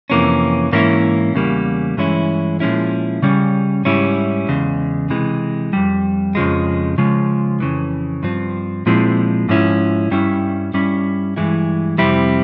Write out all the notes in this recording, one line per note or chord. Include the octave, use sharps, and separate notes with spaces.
F2 C3 E3 A#3 C#4
G#2 E3 A#3 C#4 E4
E2 C#3 G3 A#3
G2 E3 G#3 C#4 E4
A#2 F3 G#3 C#4 E4
C#3 G3 C#4
G#2 G3 C#4 E4
E2 C#3 G#3
C3 E3 G#3
F2 C3 G3
F2 C#3 F3 G#3
C#3 F3 G#3
F2 C#3 E3
G2 F3 C4
A#2 F3 G#3 C4 E4
G#2 F3 C#4 E4
G2 G3 C#4 E4
G2 G3 C#4 E4
G2 E3 G#3 E4
F2 C3 G3 C4 E4